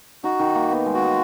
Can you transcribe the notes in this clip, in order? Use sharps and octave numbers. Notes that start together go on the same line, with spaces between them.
D#4 F#4
D#3
A#3
B3
G#3
F#4
G#3